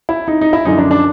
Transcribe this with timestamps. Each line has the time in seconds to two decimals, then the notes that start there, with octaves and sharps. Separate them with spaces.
0.09 E4
0.28 D#4
0.41 D#4
0.53 E4
0.65 F#2 D3 F3 D#4
0.78 D4
0.91 D4